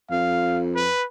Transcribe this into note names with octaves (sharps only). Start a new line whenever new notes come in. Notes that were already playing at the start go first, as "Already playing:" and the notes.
F2 F5
B4